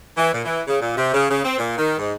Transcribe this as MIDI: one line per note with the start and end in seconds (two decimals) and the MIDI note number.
0.16 0.31 52
0.33 0.45 46
0.45 0.61 52
0.67 0.77 49
0.80 0.96 46
0.97 1.13 48
1.13 1.29 49
1.29 1.42 49
1.44 1.58 60
1.58 1.77 46
1.78 1.96 51
1.98 2.13 44